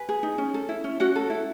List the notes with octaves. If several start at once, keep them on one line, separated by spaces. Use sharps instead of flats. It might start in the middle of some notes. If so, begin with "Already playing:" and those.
Already playing: B4 G#5
G#4
D#4
C#4
A4
E4
C#4
C#4 F#4 F#5
A4
E4